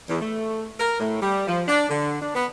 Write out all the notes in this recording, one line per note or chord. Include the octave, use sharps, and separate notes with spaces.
E2
A3
A#4
A2
G3
F3
D4
D3
D4
B3